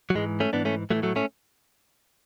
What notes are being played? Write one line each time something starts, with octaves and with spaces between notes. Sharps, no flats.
F#3
G#2 E3 G#3
A3 C#4
G#2 E3 B3 D4
A3 C#4
A2 E3 F#3 A3
F#3 A3
A3 C#4